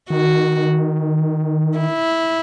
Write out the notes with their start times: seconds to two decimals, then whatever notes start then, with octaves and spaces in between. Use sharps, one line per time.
0.10 D#3 F#4
1.78 E4